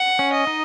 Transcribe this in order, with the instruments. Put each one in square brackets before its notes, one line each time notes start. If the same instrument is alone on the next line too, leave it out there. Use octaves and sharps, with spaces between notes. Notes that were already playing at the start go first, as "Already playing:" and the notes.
Already playing: [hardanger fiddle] F#5
[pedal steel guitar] C#4
[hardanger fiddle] D#5
[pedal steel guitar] D#4